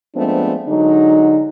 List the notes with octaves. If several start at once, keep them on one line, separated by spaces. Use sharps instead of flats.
F3 G#3 A3 B3 C4 D4
D3 F#3 G#3 D#4